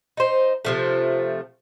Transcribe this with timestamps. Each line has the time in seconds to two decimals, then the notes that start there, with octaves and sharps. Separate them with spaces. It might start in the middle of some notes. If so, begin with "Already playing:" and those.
0.17 D#4 C5
0.65 C3 F3 A3